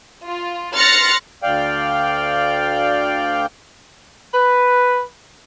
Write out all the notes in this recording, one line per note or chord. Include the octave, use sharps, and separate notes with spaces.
F4
C6 F6 F#6 A6 A#6 C#7
D2 D5 F5 G5
B4